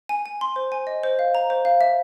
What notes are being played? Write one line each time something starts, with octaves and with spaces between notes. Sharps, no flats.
G#5
G#5
C6
C5
G#5
D#5
C5
F5
A#5
C5
F5
E5